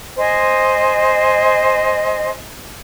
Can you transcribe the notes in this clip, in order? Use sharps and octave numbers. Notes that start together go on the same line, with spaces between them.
C5 D#5 G#5